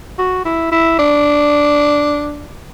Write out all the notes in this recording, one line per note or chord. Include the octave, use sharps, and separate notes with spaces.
F#4
E4
E4
D4